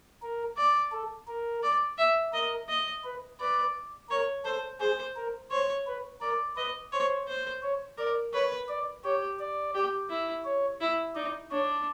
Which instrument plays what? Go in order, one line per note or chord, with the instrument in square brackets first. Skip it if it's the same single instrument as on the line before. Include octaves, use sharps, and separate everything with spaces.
[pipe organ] A#4
[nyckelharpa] D5
[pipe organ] A4
A#4
[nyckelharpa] D5
E5
[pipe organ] A#4 [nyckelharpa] D#5
[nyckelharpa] D#5
[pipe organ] B4
[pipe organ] B4 [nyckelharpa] D5
[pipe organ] A#4 [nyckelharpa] C#5
[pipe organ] A4 [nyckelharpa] C5
[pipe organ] G#4 [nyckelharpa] C5
[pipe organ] A#4
[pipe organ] C5 [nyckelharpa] C#5
[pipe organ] B4
[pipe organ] A#4 [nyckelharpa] D5
[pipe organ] B4 [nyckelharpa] D#5
[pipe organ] C5 [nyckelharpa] C#5
[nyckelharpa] C5
[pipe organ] C#5
[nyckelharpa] A#4 [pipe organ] D5
[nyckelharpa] B4 [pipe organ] C#5
[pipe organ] D5
[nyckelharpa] G4 [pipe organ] C#5
[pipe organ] D5
[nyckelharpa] G4
E4
[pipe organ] C#5
[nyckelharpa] E4
[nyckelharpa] D#4 [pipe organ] D5
[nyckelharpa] D4 [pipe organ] C#5